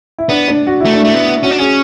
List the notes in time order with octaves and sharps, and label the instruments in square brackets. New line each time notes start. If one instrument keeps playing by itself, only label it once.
[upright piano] E4
[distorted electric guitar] B3 [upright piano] D4
[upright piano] D4
F#4
[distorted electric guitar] A3 [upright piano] E4
[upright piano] D4
[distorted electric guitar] A3 [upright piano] E4
[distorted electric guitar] B3
[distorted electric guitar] C#4 [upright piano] F#4
[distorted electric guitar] D4
[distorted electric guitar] C#4 [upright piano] G#4